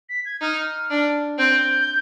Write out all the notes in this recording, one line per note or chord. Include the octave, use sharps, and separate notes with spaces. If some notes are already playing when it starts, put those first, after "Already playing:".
B6
G#6
D#4 F6
D4
C4 G6